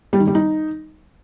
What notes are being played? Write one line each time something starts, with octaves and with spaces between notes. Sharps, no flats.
G3
D#3
G3
D#4